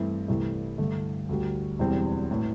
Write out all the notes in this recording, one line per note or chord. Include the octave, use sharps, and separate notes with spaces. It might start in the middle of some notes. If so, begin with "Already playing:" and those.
Already playing: G2 E3 A3 C4 E4
C2 C3 E3 A3
G2 D3 A3
D2 D3 G3
E1 E2 E3 G3 C4
A2 E3